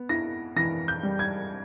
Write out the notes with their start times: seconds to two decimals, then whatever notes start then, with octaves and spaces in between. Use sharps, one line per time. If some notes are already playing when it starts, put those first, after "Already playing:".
Already playing: B3
0.09 E4 A#6
0.56 E3 A#6
0.88 G6
1.03 G3
1.19 G#6